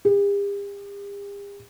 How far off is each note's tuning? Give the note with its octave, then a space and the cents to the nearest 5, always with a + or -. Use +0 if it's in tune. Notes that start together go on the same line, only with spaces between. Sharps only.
G4 +45